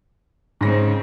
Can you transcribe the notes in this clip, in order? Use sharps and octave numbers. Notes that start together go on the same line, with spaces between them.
G#2 C#3 C4 A#6